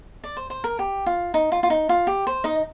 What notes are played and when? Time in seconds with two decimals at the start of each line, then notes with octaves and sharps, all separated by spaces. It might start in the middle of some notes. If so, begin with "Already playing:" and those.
0.24 D5
0.37 C5
0.50 C5
0.64 A#4
0.79 G4
1.06 F4
1.34 D#4
1.52 F4
1.63 F4
1.70 D#4
1.89 F4
2.07 G4
2.27 C5
2.44 D#4 D#5